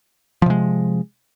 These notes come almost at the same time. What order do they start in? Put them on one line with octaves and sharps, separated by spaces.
F3 C3 G#3